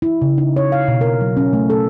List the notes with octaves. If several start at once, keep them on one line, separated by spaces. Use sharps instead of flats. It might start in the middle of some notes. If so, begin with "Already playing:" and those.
E4
C#3
D#4
C#5
F5
B2
A#4
F#3
C#4
A3
A4